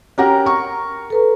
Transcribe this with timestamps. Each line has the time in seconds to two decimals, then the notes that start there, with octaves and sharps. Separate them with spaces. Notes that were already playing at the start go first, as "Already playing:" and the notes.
0.18 C#4 G4 A#4 F#5 A#5
0.46 C#6
1.10 A4 B4 A#5